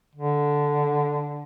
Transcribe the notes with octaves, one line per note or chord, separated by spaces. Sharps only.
D3